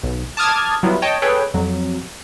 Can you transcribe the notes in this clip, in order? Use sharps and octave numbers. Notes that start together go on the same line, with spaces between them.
B1
A5 D6 D#6 F6 G#6 A6
F#3 G3 B3 E4 F4
C#5 D#5 G5 A5
G#4 A4 B4 C#5 G5
F2 F#3